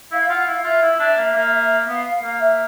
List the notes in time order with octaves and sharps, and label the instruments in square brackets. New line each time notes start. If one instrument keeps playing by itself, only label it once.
[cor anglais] E4 [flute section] F5
[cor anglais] F4 [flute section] F#5
[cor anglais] E4 [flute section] F5
[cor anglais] F4 [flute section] E5
[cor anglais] E4
D4
A#3
A#3
[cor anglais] B3 [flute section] F5
[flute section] F5
[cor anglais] A#3
[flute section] E5